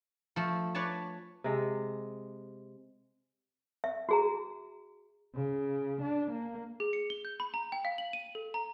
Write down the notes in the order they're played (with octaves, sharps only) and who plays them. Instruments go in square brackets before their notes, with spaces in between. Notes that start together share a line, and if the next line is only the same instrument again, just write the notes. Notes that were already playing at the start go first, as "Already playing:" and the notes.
[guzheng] F3 A3
B4 C#5 D5 G#5 A5
[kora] C3 G#3
[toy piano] E5
F#4 G#4 A#5
[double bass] C#3
D4
A#3
[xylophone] G#4
C#7
G7
G6
B5
A#5
G5
F5
F#7
D#7
A4
A#5